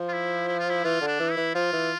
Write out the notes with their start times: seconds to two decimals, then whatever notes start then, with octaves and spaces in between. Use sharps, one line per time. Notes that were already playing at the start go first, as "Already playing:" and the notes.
Already playing: F3
0.08 F4
0.13 E4
0.48 E4
0.59 F4
0.70 E4
0.84 E3 F4
1.01 D3
1.07 D4
1.20 E3
1.32 E4
1.37 E3
1.55 F3 F4
1.73 E3